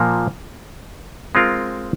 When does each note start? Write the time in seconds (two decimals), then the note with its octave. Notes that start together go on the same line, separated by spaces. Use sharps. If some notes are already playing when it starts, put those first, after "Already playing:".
Already playing: A#2 F3 A#3
1.35 G#3 C4 F4 A#4